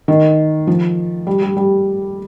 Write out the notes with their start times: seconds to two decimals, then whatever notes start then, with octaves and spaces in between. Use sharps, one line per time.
0.08 D#3
0.67 F3
1.27 G3
1.42 G3
1.57 G3